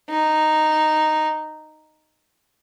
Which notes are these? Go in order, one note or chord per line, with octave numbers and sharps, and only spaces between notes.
D#4